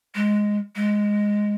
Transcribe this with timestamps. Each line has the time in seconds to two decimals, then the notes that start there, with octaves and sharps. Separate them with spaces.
0.15 G#3
0.76 G#3